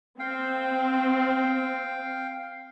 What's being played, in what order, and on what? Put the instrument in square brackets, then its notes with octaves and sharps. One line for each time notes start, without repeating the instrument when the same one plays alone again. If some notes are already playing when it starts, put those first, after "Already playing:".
[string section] C4 [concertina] F5 G5